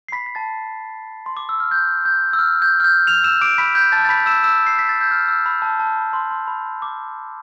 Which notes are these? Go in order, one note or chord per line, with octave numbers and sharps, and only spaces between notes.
C7
B5 B6
B6
A5 A6
C6
D6
E6
F6
G6
G6
E6
F6
G6
F6
G6
F6 F7
E6 E7
D6 D7
B5 B6
G6
A5 A6
A6
B5 B6
E6 E7
E6 E7
C7
B6
A6
G6
F6
E6
B5
A5
A5
B5
C6
C6
B5
D6